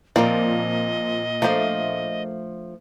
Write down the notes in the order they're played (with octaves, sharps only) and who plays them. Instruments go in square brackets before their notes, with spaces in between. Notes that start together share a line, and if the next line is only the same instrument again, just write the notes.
[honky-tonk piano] A#2 [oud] F3 C4 A#4 [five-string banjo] A#3 D5 [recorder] D#5
[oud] F3 A3 D4 [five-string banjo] A#3 C5